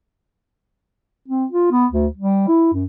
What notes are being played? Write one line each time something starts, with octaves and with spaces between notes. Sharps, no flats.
C4
F4
B3
D2
G3
E4
F#2